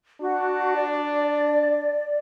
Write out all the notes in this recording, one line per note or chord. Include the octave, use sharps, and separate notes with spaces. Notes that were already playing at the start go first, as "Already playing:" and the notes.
D4 F#4
D5